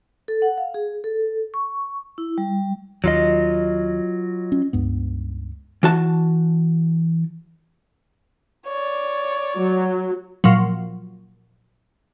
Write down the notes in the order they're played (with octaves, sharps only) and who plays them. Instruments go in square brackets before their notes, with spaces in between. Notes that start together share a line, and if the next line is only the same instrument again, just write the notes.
[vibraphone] A4
F#5
F5
G#4
A4
C#6
E4
G3
[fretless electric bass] D#2 [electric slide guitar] F#3 F4 D#5
[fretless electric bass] C#4
C#2 G2 B3
[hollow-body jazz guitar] E3 F#4 A5
[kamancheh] C#5 D5
[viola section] F#3
[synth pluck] A#2 F3 F#3